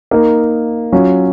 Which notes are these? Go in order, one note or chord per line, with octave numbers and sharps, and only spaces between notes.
A#3 D#4 A#4
F#3 C#4 F4